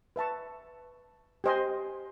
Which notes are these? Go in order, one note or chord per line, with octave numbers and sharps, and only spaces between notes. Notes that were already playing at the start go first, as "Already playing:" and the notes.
B4 E5 A5 C#6
G4 C5 D#5 G#5 C6